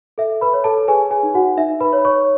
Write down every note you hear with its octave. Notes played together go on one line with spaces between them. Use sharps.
A4 E5
B4 B5
C#5
A4 A5
G#4 B4 G#5
G#4 G#5
D#4
F#4 F#5
D#4 E5
B4 B5
C#5
B5
C#5 C#6